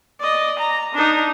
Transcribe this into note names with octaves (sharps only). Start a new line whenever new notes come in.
D5 D#5
A#5
D4 D#4